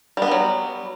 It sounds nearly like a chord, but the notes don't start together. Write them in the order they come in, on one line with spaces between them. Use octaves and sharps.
G3 B3 D#3 F#3